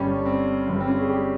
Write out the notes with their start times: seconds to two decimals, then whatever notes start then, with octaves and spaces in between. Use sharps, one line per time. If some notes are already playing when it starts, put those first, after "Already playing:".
Already playing: G1 G2 G3 C#4
0.26 C4
0.67 G1 G2 G3 C4
0.80 C4
0.88 C#4
1.00 G#4
1.09 G4